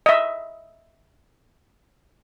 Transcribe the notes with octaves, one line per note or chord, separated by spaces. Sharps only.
D#5 E5